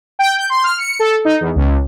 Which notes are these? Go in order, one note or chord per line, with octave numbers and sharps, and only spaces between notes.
G5
G6
C6
F6
C#7
A4
D#4
E2
C#2